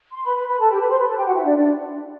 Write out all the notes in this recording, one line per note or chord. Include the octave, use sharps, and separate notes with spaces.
C6
B4 B5
B4 B5
B4 B5
A4 A5
G4 G5
B4 B5
C5 C6
B4 B5
A4 A5
G4 G5
F#4 F#5
E4 E5
D4 D5
D4 D5